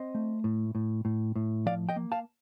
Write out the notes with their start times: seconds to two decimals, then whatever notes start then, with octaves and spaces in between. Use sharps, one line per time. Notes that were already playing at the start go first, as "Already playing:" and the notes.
Already playing: C4 C5 D#5
0.15 A3
0.44 A2
0.75 A2
1.05 A2
1.36 A2
1.66 F3 D5 F5
1.89 D#5 G5
1.96 A#3
2.12 F5 A5